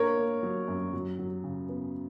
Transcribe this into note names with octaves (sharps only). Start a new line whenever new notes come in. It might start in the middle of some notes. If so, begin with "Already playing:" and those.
Already playing: A#3 D4 A#4 C#5
A#3
F#3
F#2
F#3
F#3
C#3
B3